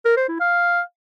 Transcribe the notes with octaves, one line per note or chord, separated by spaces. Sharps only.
A#4
C5
E4
F5